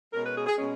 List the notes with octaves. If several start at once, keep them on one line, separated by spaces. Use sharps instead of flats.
B2 G#3 C#4 A#4
B4
G#4
G#4
B2 G#3 C#4